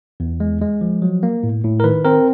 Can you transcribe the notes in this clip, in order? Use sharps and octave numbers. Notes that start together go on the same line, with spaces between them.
E2
G#3
G#3
F3
F#3
A#3
A2
A2
A#4
D#3 B4
C4 A#4